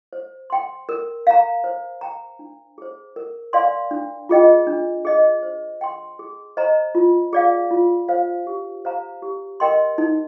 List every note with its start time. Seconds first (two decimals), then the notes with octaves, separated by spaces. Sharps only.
0.13 C5
0.50 G5 C6
0.89 A#4
1.27 F5 A#5
1.64 C5
2.01 G5 A#5
2.39 D4
2.78 G#4 C5
3.16 A#4
3.53 D5 F5 G#5 C6
3.91 D4
4.29 F4 G#4 D#5 G5
4.67 D4
5.05 G#4 D#5
5.43 C5
5.81 G5 C6
6.19 G#4
6.57 C5 D#5 A#5
6.95 F4
7.33 G#4 D5 F5
7.71 F4
8.09 C5 F5
8.47 G4
8.85 C5 F5 A#5
9.22 G4
9.60 A#4 D#5 G5 C6
9.98 D#4